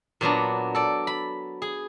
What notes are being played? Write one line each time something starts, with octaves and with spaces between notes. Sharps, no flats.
A#2 F#3 B3 D4
A4 D5
B5
G#4